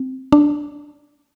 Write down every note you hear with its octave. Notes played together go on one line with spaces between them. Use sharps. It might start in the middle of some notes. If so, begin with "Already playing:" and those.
Already playing: C4
D4